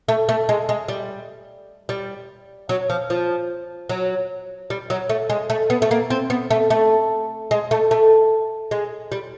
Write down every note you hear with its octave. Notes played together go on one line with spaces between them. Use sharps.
A3
A3
G#3
G#3
G3
G3
F#3
F3
F3
F#3
G3
F#3
A3
G#3
A3
B3
A3
A#3
C4
B3
A3
A3
G#3
A3
A3
G#3
G3